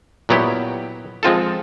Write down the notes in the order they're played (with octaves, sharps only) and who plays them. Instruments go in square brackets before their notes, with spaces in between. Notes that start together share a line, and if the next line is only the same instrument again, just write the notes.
[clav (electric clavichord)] A#2 F#3 B3 E4 G4
F3 G#3 C4 F4 A4